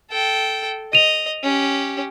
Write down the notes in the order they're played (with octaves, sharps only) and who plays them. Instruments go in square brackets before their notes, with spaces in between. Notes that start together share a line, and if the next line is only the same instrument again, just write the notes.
[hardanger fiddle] A4 G5
[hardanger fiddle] D#5 [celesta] D#7 F7
[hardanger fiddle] C#4 G4